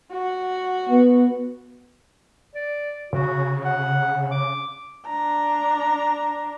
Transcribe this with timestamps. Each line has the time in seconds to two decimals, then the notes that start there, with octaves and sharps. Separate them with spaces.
0.12 F#4
0.89 B3
2.55 D5
3.13 C#3 F#4
3.65 F#5
4.31 D6
5.07 D4 A#5